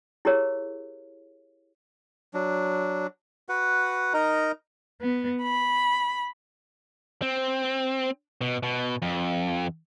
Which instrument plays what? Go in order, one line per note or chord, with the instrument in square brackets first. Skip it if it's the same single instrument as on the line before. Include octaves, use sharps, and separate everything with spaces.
[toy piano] E4 G4 G#4 A#4 C#5
[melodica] F#3 D4
F#4 B4 F#5
D#4 A#4 D#5 A#5
[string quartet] B3
B5
[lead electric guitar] C4
B2
B2
F2